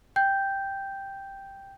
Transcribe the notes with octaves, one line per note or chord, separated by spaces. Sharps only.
G5 G6